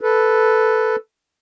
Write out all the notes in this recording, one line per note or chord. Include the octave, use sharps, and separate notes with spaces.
A4 B4